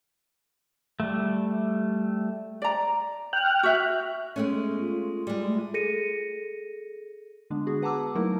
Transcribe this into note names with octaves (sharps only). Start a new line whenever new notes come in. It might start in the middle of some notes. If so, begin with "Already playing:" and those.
G3 A3
D5 A#5
G5 F6 F#6
F#4 E5
G#3 A3 B3 C#4
F4
G3 G#3
A3
G#4 A4 A#6 C#7 D#7
D3 G#3 B3 D4
B3 F#4 G#4
B4 F#5 A5 A#5 D6 E6
F#3 A3 A#3 D#4 E4 A#4